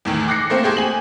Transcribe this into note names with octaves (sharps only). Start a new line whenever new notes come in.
E2 A2 D#3
D6 F#6 A#6 C7 C#7
A3 A#3 C4 C5
A3 G4 G#4 C5 G5
G#5 F#7